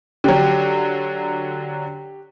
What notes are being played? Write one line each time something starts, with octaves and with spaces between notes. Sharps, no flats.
D3 F#3 G4